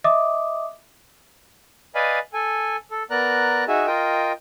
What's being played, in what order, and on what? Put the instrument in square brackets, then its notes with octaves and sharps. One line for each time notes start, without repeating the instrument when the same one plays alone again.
[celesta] D#5 E5 D6 D#6
[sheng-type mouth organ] B4 D5 D#5 F5 G#5 B5
A4 G#5
A4
B3 A#4 D5 A#5 F#6
D#4 F#4 G#4 E5
F4 A#4 D#5 G5